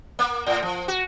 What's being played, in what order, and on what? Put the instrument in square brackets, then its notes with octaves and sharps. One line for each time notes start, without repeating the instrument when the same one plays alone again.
[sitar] A#3
A2
F3
F#4